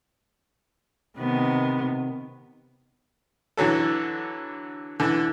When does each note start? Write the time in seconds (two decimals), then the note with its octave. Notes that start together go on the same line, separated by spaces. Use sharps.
1.17 C3 D#3 B3
3.57 D3 E3 F#3 A4
5.00 D3 E3